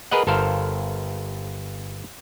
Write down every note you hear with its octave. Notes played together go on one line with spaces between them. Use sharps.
G#4 A#4 B4 D#5 F#5
G1 A4 A#4 C5 F5